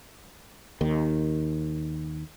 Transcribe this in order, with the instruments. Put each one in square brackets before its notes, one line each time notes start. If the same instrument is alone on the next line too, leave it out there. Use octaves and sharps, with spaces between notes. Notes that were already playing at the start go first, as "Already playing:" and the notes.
[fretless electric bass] D#2 D#3